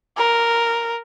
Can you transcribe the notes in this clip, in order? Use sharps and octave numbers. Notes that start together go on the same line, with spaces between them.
A#4